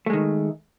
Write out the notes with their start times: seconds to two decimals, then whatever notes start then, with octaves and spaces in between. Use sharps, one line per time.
0.06 A3
0.10 G#3
0.13 D#3